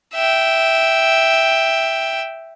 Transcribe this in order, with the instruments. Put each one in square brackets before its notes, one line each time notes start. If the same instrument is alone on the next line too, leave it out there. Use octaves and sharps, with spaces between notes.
[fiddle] E5 G5